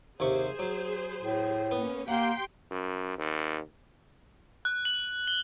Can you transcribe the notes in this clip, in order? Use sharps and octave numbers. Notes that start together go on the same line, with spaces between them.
D#2 C3 G#4 C5 C#6
F#3
A2
A#3 B3 C#4
A#3 G4 F#5 G5 C6
F#2
D#2
F#6
F#7
G7